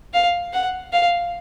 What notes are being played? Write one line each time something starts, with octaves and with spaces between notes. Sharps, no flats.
F5
F#5
F5